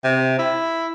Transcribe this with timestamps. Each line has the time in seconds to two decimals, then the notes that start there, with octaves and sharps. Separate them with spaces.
0.04 C3
0.39 E4